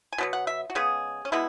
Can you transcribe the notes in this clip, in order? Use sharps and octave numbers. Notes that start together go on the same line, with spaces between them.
G#5
B2 F#3 B3
F#5
E5
F#4
C#3 G#3 B3 G#4
C#4
B2 G#3 B3 E4